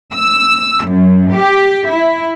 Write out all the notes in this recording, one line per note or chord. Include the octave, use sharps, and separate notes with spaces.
E6
F#2
G4
E4